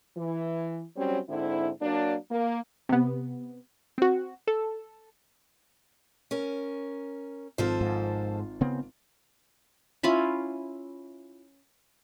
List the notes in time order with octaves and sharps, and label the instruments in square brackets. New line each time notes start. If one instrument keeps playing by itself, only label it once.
[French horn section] E3
F#3 G3 C4 C#4
G#2 D3 C4 E4
F#3 A#3 D4
A#3
[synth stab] C3 B3
C4 F#4
A4
[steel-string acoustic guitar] C#4 A#4
[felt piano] G#1 F4 [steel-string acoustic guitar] F3 A4 C5
[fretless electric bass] G#2
C#3 B3 C4
[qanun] C#4 E4 F4 B5